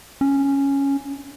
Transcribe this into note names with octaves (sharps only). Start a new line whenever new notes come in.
C#4